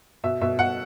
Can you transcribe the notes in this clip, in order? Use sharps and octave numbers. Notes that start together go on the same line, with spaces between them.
B2 E5
B2 E5
B2 F#5